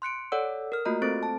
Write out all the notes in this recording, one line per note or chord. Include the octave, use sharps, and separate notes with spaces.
C6 F#6 C#7 D7
A4 C#5 D5 F#5 E6
A#4 F6
A3 A#3 F4 F#4 D#5 A#5
A3 C4 A4 C5 A6 D7
A5